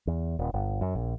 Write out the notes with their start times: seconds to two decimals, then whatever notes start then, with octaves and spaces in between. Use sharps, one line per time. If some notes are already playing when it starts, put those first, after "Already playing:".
0.07 E2
0.39 D#1
0.54 G1
0.81 F#2
0.95 A#1